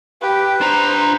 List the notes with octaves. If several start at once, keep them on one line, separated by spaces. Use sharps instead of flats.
G4 B4
D4 C5 A#5